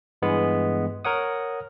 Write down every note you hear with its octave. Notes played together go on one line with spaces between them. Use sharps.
G2 E3 G#3 B3
A#4 C#5 F#5 D#6